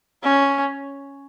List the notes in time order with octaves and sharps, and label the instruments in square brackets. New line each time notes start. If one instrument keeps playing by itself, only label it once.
[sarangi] C#4